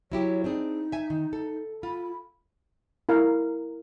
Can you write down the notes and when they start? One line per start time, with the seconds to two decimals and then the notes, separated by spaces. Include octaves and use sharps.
0.12 F#3 E4 G4 C#5
0.44 C4 D4 D#4 G#4
0.92 E5 G#5
1.10 D#3
1.33 A4
1.83 F4 B5
3.09 E4 A#4 F5